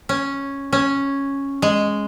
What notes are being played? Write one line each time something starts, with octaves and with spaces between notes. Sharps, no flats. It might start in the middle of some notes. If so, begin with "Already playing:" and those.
C#4
C#4
G#3